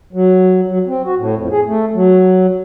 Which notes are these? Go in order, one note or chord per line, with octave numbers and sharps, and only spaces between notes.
F#3
F#3
C4
F#4
A2
F2
G#4
A3
F#3